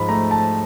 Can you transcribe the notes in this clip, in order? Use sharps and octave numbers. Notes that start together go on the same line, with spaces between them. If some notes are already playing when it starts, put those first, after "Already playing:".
Already playing: G#2 F3 B5
A3 A#5
A5